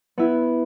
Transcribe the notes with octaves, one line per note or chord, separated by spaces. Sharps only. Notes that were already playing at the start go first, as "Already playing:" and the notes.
B3 E4